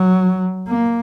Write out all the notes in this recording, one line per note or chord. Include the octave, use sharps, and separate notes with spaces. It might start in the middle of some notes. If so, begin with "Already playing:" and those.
Already playing: F#3
A#3